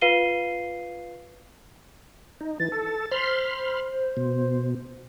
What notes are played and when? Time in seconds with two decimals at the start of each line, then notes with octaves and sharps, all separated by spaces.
0.01 F4 B4 F5 C7 D#7 G7
2.41 D#4
2.60 E3 A6
2.72 A4
3.12 C5 B5 C6 F6
4.17 B2